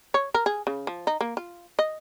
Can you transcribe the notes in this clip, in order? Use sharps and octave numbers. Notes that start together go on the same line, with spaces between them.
C#5
A#4
G#4
C#3
F3
D#4
A#3
F4
D#5